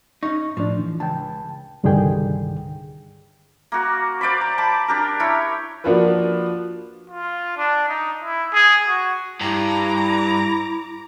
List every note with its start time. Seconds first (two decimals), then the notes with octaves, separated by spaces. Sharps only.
0.23 C#4 D#4 C#6
0.57 A2 F3 D4
0.79 E3
1.00 C#2 G5 A5
1.83 C2 G2 D3 D#3 G#4 G5
3.72 A#3 F#4
4.21 C5 D5 F5 B5
4.41 A#5
4.58 A5 B5 D6
4.88 D4 G4 A#4
5.20 E4 A#4 C#5
5.84 F3 A#3 D4 F4 F#4 B4
7.10 F4
7.57 D4
7.89 D#4
8.23 E4
8.53 G#4
8.88 F#4
9.41 G2 E4 A#5 D6